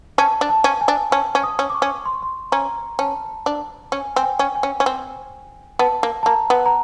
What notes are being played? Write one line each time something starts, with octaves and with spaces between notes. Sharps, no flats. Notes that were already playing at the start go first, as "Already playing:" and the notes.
C#4 A5
D4
A5
C#4
G#5
D4
C#4 A5
C#4
D#6
C#4
D6
C#6
C#4
C6
C#6
C6
C#4 A#5
C#4 A5
D4
C#4 G#5
C4 G#5
G5
C#4
G#5
C#4
C#4
C4
B3 A5
A#3
A5
A#3 A#5
B3
A#5